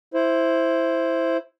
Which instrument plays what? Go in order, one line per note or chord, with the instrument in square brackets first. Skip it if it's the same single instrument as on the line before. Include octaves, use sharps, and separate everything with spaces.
[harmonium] E4 C5